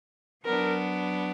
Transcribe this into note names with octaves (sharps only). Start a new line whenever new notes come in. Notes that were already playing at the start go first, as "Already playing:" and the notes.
F#3 B3 D4 A#4